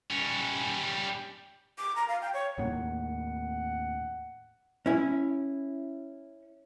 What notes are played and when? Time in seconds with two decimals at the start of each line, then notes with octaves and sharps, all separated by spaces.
0.10 G3 C#4
1.78 D6
1.96 A#5
2.08 F5
2.21 G5
2.34 C#5
2.58 D#2 A2 A#3 F#5
4.86 C#4 E4